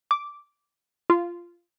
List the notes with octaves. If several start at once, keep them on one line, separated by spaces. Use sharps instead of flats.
D6
F4